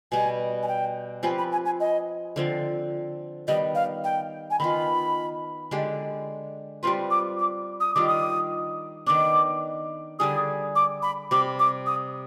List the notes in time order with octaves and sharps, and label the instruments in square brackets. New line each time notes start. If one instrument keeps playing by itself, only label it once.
[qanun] B2 G3 B3 [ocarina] G#5
[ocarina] G#5
G5
[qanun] F3 C4 G4 B4 [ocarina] G#5
[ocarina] B5
G#5
G#5
D#5
[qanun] D3 F3 C4
[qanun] D#3 G3 B3 [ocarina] D#5
[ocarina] F5
G5
G#5
[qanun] D#3 B3 F4 [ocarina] B5
[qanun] D3 G#3 D4 G4
[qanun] G3 C4 F4 B4 [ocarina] C6
[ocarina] D6
D6
D#6
[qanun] D#3 G3 D4 F4 [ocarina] D6
[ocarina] D#6
[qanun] D#3 B3 D4 [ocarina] D6
[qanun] D3 G3 D4 G#4 [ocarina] D#6
[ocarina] D6
B5
[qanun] C3 G3 C4 [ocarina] D6
[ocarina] D6
D#6